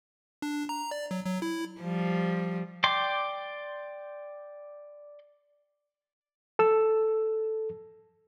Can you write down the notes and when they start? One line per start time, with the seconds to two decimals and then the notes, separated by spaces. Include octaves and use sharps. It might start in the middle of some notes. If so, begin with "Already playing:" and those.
0.42 D4
0.69 A#5
0.91 D5
1.11 F#3
1.26 F#3
1.42 E4
1.81 F3 G3
2.84 D5 G5 C6 D6
6.59 A4 E6